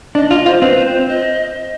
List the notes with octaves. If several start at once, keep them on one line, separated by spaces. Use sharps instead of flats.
D4 D#5
F4 D#5
F4 C5
C4 B4
C5
D#5